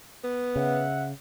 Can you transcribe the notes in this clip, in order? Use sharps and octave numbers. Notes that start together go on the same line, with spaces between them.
B3
C#3 E5 F#5